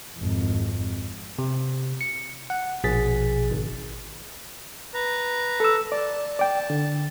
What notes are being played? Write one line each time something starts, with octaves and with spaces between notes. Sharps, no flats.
G#1 F2
C3
C#7
F#5
A#1 B2 G#4 A6 B6
G#1
B4 A#5
A4 E6
D5 A5
D5 G5
D3